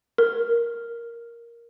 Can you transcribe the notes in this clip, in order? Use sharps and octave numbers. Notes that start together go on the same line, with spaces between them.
A#4